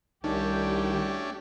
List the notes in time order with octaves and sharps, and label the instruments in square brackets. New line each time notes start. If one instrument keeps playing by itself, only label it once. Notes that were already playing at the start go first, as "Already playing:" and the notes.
[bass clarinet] C2 [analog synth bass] D#3 [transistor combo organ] A3 C#4 D4 [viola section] G4